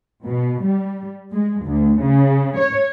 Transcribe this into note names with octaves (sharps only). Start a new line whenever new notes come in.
B2
G3
G#3
D2
C#3
C#5